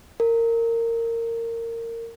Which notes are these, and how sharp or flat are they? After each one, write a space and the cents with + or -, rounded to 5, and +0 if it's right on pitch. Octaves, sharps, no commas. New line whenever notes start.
A#4 -20